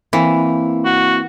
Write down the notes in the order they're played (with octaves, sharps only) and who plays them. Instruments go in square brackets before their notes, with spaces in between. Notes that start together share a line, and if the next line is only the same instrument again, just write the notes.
[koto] E3 [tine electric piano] A#3 C4 E4
[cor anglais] F#4